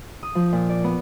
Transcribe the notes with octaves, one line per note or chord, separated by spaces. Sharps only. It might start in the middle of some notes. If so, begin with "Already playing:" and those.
D#6
F3
A#2
D5
B3